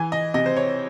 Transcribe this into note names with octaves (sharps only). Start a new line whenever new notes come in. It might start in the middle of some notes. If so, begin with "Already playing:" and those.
Already playing: E3 G#5
D#5
C3 D#5
C5
C#5